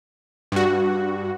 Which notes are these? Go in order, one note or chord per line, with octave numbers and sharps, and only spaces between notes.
G2 F#4